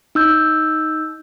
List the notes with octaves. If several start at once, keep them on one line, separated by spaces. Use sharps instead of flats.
D#4 E6 G6